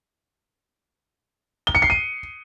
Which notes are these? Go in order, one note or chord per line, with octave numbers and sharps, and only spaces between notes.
G7
C#7
C7
D#7